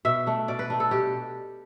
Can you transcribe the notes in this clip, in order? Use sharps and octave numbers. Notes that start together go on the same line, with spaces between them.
B2 E5
A3 D4
B2 D5
B4
A3 D4
A4
B2 G4